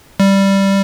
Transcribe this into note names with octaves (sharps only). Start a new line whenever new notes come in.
G3